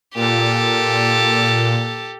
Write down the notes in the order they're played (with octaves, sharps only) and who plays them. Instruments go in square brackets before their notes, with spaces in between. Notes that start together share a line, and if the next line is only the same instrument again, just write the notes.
[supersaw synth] A#2 [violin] G4 A4